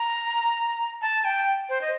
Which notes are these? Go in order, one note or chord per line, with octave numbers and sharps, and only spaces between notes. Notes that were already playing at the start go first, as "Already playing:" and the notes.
Already playing: A#5
A5
G5
C5
D#5